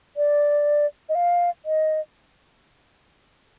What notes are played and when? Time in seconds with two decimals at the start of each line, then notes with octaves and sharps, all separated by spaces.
0.17 D5
1.09 D#5
1.15 F5
1.65 D#5